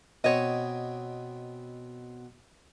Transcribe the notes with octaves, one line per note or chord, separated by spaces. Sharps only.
B2 B3 C4 C#5 D#5